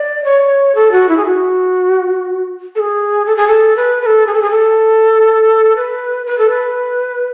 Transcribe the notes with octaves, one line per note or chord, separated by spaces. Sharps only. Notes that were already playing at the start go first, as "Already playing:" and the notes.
Already playing: D5
C#5
A4
F#4
E4
G#4
F#4
A4
G#4
A4
G#4
A4
B4
B4
A4
G#4
A4
G#4
A4
B4
B4
A4
B4